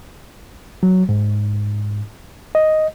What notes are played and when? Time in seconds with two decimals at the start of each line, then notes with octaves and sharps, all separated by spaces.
0.83 F#3
1.09 G#2
2.55 D#5